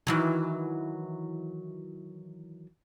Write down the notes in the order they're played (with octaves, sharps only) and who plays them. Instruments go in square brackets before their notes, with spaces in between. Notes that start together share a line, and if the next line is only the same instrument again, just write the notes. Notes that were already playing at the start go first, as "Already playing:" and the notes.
[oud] D#3 E3 F#3